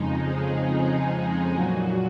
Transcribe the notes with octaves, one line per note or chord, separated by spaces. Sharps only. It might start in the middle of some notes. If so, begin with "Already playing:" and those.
Already playing: F2 C#3 F3 G#3 D#4
G#4
G#4
A#2 F#3 F#4